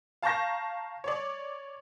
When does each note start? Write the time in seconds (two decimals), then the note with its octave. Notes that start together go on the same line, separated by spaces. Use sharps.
0.22 F5 A5 A#5 C#6 G6 A#6
1.04 C#5 D5